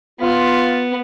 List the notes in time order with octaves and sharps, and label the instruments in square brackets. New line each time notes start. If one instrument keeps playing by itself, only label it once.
[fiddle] B3 [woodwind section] F4